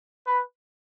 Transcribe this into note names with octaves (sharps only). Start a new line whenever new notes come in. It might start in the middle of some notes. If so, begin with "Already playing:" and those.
B4